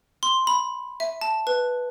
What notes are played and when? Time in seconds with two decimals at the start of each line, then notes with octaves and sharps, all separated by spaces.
0.23 C6
0.47 B5
1.00 E5
1.21 A5
1.47 B4